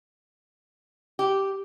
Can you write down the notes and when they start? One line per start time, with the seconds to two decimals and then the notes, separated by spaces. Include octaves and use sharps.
1.19 G4